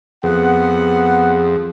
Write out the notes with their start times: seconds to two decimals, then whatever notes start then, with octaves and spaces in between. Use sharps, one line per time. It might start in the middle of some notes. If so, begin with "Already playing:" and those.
0.23 F2 B3 G#4 F#5